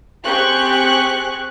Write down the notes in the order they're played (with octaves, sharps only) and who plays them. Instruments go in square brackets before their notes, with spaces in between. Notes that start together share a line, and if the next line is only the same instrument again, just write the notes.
[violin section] C4 G4 G#4 C#6 F#6